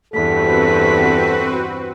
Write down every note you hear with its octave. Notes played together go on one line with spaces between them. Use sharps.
E2 G2 C4 F#4 A4 B4 B6